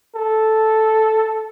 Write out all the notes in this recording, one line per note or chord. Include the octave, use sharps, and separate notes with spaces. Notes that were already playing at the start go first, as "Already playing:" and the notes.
A4